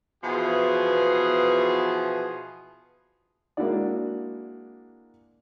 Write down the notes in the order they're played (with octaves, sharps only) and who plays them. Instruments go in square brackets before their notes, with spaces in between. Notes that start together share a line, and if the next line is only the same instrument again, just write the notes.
[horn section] B2 E3 F3 B3 G#4
[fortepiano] G#3 A#3 D4 E4 F#4 D5